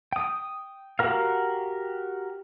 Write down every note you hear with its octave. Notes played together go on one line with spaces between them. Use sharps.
G5 D#6
F#4 G4 A#4 F5